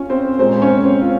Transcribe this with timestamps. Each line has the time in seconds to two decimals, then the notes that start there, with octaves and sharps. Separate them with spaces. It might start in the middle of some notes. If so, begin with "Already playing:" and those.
Already playing: C#4 F4
0.10 C4 C5
0.39 A#2 G#3 C4 C5
0.62 C#4 C#5
0.84 C4 C5
1.01 F4